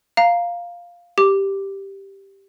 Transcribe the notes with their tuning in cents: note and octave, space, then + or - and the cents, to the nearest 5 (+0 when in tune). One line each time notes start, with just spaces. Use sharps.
F5 +0 A#5 +0
G4 +0 D6 +0